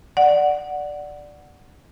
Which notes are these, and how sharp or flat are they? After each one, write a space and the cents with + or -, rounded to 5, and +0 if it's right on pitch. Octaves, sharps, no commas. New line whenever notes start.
D5 +0 F#5 +0